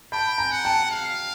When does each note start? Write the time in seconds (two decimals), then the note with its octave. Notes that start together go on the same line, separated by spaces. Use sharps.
0.12 G5 A5 B5
0.38 G#5 A#5
0.51 F#5
0.65 G5 A5
0.91 F5